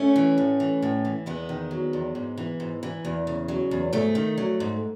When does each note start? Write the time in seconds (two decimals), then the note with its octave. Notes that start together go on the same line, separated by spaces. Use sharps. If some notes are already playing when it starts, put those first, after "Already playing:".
Already playing: A3 C#4
0.16 E3
0.38 A2
0.60 E3
0.82 A2
1.05 E3
1.26 E2 G#3 B3
1.49 D#3
1.71 F#3
1.93 E2
2.15 G#2
2.38 E3
2.60 G#2
2.83 E3
3.05 E2
3.27 C#3
3.48 F#3
3.71 E2
3.93 G#2 A3
4.15 D#3
4.38 F#3
4.60 G#2